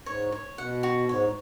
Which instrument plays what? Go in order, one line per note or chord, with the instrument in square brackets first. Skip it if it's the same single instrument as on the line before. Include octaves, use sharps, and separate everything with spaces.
[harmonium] G#2 [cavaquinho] C#5
[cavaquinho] C#5
[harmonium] B2 [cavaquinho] F#5
[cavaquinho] F#4
[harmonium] G#2 [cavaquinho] C#5